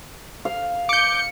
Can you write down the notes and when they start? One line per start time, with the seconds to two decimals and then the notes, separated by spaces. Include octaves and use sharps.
0.45 F5
0.89 D6 G6 C#7